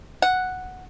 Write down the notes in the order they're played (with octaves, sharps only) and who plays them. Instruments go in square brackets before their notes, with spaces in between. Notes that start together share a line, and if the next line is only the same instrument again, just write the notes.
[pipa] F#5